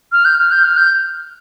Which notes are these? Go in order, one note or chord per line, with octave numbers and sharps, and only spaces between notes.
F6
G6
F6
G6
F6
G6